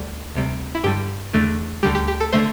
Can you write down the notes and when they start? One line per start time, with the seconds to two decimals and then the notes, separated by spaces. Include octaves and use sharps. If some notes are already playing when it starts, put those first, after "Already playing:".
Already playing: D2 D3 G3
0.35 D2 C3 G3
0.75 E4
0.84 G2 D3 G3 G4
1.33 E2 D3 A3
1.83 D2 D3 G3 G4
1.95 G4
2.08 G4
2.20 A4
2.32 D3 A3 C5